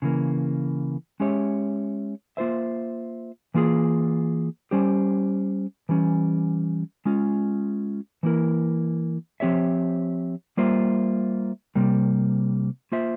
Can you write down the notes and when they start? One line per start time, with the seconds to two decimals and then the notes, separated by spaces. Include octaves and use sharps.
0.02 C#3 E3 A#3
1.20 G#3 C#4 G4 C#5 E5
2.37 A#3 F4 C5 E5
3.54 E3 A#3 F4 G#4
4.71 G3 C#4 G4 C5
5.89 E3 G3 C#4
7.05 G#3 C#4 F4
8.23 E3 A#3 E4 A#4
9.40 F3 C4 G4 C#5 E5
10.57 G3 A#3 F4 C5 E5
11.75 C3 G3 A#3
12.92 A#3 F4 C5 E5